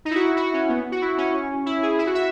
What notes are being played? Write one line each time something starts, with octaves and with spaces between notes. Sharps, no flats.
D#4
E4
F#4
F#4
F#4
C#4
B3
F#4
E4
C#4
E4
G#4
E4
F#4
E5